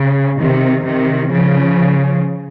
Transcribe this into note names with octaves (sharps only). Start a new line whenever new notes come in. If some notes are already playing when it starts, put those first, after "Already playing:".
Already playing: C#3
C3 D#3
C3 D#3
C#3 F3